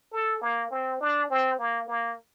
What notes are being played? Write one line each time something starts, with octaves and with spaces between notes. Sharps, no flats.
A4
A#3
C4
D4
C4
A#3
A#3